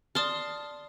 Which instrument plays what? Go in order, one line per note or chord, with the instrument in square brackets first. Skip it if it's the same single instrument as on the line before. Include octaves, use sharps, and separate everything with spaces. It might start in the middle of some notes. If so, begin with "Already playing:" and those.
[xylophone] D5 D#6 F6 [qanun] A5 C6